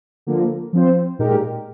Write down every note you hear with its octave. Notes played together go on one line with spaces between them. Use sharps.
D3 F3 A#3
F3 C4 F4 C5
A#2 G#3 D#4 G4 A#4